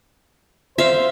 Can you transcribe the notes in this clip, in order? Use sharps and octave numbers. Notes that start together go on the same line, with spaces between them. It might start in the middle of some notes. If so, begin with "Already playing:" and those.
C5 E5 F5